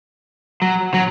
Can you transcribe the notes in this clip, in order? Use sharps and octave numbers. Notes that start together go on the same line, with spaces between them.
F#3
F#3